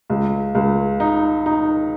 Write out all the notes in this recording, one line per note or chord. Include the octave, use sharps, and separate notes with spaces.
C#2
C#2
D#4
D#4